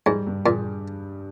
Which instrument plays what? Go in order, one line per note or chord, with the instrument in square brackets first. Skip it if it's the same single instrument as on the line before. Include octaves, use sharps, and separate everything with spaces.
[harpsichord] G#2 [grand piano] G3
[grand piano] G2
[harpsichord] A#2 [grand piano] G#4